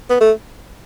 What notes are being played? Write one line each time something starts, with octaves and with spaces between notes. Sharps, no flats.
B3
A3